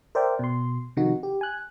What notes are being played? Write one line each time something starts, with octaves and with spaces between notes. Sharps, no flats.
A#4 C5 D5 E5 G5
B2 C6
C3 D#3 F3 D#4 F#4
G4
G#5 F#6